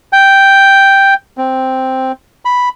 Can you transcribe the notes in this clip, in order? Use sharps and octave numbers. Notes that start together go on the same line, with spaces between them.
G5
C4
B5